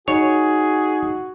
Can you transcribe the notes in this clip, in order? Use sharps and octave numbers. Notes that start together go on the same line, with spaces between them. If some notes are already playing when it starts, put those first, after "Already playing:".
D#4 F#4 G#4 C#5